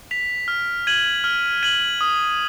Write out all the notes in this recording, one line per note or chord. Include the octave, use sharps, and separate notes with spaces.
B6 F7
F6
G#6 D#7 F#7
F6
G#6 D#7 F#7
D#6